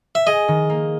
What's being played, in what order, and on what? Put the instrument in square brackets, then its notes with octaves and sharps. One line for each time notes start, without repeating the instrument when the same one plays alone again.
[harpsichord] E5
[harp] G#4 [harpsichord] D#5
[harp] D#3
A#3